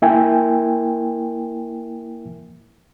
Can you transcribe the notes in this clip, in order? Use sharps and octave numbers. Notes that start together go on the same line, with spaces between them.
A#3 E4 A#4 E5 G5 G#5